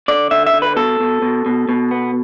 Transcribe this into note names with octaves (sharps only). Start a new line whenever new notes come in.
D3 D5
D3 E5
E5
D3
B4
B2 A4
B2
B2
B2
B2
B3